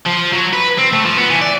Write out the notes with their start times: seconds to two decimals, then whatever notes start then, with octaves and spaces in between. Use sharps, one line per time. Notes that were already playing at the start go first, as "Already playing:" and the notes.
0.06 F3
0.33 F#3
0.53 B4
0.78 C4
0.93 A3
1.05 F3
1.18 B3
1.30 E3
1.41 D5